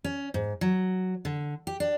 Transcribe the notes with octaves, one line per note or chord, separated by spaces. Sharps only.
C#4
G#2
F#3
D3
G4
D4